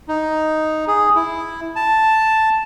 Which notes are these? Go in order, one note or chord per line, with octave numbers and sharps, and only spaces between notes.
D#4
G#4
E4
A5